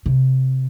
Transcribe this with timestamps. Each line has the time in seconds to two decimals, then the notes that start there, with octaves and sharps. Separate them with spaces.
0.06 C3